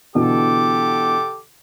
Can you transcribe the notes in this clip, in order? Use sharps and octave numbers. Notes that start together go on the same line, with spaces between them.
B2 D3 E3 G4 A4 D6